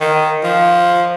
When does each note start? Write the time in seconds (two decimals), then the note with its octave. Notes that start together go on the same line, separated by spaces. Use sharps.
0.01 D#3
0.44 F3